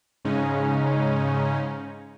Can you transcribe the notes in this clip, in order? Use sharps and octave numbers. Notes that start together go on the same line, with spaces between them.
G#2 C#3 G#3 C#4 D#4